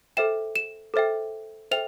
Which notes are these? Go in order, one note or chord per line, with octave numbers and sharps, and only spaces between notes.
A4 C5 E5 G5 E7
E7
A4 C5 E5 G5
A4 C5 E5 G5 F7